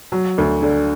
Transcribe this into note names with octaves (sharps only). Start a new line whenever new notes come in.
F#3
D2
D3